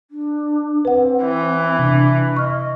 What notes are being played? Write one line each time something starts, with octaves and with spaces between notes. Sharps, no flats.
D4
C4 B4 F#5
E3
C3 D4
D#5 C#6 F6